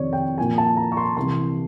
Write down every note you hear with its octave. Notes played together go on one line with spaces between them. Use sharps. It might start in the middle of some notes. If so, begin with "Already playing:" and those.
Already playing: F2 C3 D#3 C#5 D5
G5
A#2 F3 A#3 G#5
A5
A#5
C#6
C6
C2 C3 E3 C6